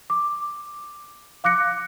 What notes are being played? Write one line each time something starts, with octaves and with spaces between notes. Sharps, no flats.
D6
F5 D6 F#6 A#6 C#7